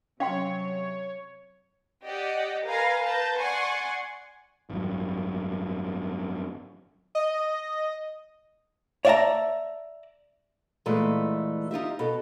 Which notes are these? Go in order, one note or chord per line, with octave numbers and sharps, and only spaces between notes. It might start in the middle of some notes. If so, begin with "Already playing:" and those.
C3 F#3 C#4 C#5 F5 G5 C6
G4 D5 D#5 F#5
A#4 B4 F5 G#5 A#5 C6
B4 A5 A#5 G6
D5 F#5 G#5 C6 C#6
G#1 F#2
D#5
C#5 D5 E5 F5 A5 A#5
A#2 E3 G#3 A3
D#4 F4 G4 E5
B2 A4